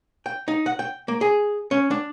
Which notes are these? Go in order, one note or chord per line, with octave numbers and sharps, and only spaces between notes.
G5
D#4
F#5
G5
A#3
G#4
C#4
D4